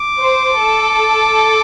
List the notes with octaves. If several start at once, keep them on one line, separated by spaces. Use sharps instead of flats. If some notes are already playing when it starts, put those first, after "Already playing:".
Already playing: D6
C5
A4